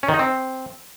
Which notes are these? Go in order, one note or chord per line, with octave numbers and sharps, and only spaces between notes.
C#4
D#3
D#4
C4